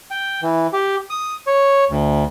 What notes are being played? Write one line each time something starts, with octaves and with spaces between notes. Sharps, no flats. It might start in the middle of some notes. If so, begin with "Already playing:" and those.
G5
E3
G4
D#6
C#5
D2